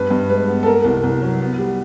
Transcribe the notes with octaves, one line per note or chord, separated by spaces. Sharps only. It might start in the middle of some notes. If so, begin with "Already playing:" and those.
Already playing: G2 B4
G2
G#3 B4
B3
A4
A#3 A#4
C2
C2
F#3
B3
G3